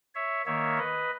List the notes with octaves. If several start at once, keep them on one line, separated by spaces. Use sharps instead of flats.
C#5 E5
D#3 A#3 C#5 E5
B4 D#5